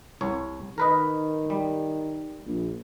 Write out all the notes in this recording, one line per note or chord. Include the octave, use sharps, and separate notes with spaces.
C2 C#5
D#3 A#4 B4 D#5
G3
A#1